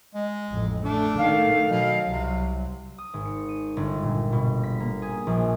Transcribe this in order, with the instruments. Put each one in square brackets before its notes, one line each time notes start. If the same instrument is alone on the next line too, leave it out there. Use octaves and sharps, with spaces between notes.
[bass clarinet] G#3
[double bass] A1 F2
[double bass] A3 [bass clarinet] D4
[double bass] D#3 A3 [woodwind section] F5
[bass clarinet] B2 [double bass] F#3
[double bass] C2 F#3 [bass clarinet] C3
[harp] D#6
G#1
C#7
D#7
G1
A#2
B2
B6
A#3
G#4
A#1